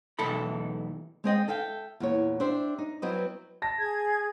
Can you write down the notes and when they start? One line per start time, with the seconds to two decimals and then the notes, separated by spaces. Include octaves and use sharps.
0.19 B1 E2 E3 A4 B5
1.24 G#3 C4 D#5 G5
1.48 A4 E5 F5 G5
2.00 E2 A#2 C#5
2.40 D4 G4 C5 E5
2.78 D#4
3.02 F#3 B3 C4 E4 D#5
3.62 A5 A#6
3.78 G#4 G#6